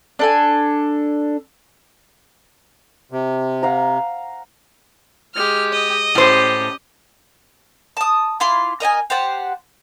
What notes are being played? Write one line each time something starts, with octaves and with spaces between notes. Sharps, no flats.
D4 A4 G#5
C3
F5 F#5 A#5
G#3 G4 F6
D#5
A2 C#4 G4 C5
A5 D#6
E4 F4 C6 D6
A#4 D#5 G5 G#5
G4 C5 F#5 A5